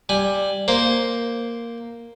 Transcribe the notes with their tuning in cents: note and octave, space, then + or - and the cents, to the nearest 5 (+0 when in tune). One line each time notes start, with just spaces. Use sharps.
G3 +5 G#5 -10
A#3 +0 C5 +0